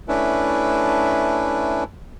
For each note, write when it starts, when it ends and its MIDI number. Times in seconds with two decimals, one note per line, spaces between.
0.08 1.84 57
0.08 1.84 61
0.08 1.84 62
0.08 1.84 64
0.08 1.84 71